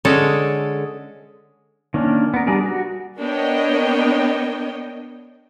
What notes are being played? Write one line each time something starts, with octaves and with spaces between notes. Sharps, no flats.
D3 G#3 C#4 A4
D#3 A#3 C#4 D4
B3 A#4
G3 D4 G#4 A#4
F#4
B3 D4 A#4 C#5 D#5 G5